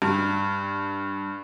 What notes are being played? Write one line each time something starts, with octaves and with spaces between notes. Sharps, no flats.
G2